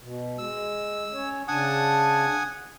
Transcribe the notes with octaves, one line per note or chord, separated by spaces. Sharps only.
B2
G#3 E6
C#4 C#5
C#3 D4 F#5 G#5 A5 D#6